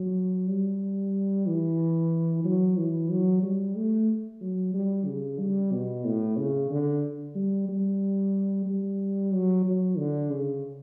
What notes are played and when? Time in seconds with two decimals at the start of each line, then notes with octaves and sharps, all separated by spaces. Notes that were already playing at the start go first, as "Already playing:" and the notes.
Already playing: F#3
0.48 G3
1.46 E3
2.44 F#3
2.77 E3
3.10 F#3
3.43 G3
3.76 A3
4.41 F#3
4.74 G3
5.06 C#3
5.39 G3
5.72 B2
6.05 A2
6.37 C#3
6.70 D3
7.35 G3
7.69 G3
8.66 G3
9.32 F#3
9.64 F#3
9.97 D3
10.30 C#3